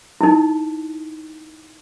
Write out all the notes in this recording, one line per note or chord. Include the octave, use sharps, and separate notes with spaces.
D#4 E4